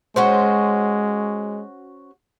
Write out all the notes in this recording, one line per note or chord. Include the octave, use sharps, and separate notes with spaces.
G#3 C#4 F#4 C5